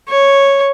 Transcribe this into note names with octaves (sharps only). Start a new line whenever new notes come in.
C#5